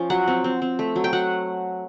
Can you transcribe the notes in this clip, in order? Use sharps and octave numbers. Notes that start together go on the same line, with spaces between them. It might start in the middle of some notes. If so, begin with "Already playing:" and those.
Already playing: F3 C#4
F#3 F#5
C4
C4
C4
A3
F#3
G5
F#3 F#5